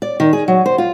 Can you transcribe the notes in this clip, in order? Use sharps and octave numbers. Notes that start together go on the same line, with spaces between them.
D5
D#3
G#4
F#3
C5
F4